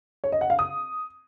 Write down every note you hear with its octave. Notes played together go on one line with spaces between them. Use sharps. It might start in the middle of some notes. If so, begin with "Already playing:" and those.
C#5
D#5
F#5
F5
D#6